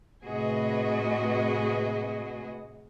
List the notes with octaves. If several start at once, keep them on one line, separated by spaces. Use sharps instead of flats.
A2 C3 F#4 G#4 B4 D#5